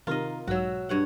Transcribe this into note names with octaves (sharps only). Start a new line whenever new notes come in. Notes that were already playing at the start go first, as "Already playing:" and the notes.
C3 D#3 F4 A#4 D#5
B1 G#2 F#3 F#4 E6
G2 C#5 F#5